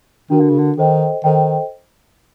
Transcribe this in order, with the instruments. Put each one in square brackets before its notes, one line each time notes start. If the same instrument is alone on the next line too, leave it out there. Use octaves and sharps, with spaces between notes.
[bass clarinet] D#3 [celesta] D4 F#4 A#4
[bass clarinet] D3
C#3
D3
[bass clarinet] D#3 [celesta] A4 C5 D#5 G5
[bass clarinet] D#3 [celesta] A4 C5 D#5 G5